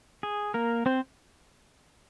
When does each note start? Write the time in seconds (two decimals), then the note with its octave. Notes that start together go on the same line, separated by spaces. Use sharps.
0.23 G#4
0.54 A#3 A#4
0.86 C4 C5